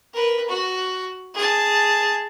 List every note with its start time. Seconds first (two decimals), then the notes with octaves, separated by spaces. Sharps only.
0.13 A#4 B4
0.48 F#4
1.35 G#4 A5